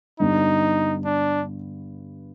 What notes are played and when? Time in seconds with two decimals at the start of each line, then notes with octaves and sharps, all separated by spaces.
0.20 G2 D3 G3 B3 D#4
1.05 D4